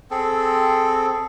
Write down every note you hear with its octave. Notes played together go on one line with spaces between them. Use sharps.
C4 G#4 A4